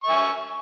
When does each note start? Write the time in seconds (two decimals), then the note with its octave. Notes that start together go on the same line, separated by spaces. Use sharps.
0.03 C#6
0.06 E5
0.09 G#5